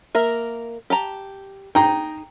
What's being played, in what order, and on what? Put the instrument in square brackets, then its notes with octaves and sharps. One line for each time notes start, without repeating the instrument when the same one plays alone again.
[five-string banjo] A#3 A#4 E5
G4 A5 A#5
[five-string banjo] D#4 G#4 [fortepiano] G5 A#5